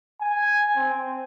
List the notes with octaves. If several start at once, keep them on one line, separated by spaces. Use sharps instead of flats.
G#5
C4